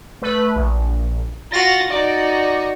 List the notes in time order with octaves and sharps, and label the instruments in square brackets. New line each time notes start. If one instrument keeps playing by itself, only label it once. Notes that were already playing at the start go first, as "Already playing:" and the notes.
[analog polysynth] A3 B4
A#1
[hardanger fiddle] F4 F#4 [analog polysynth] A6 A#6
[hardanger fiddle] D#4 F#4 [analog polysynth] D5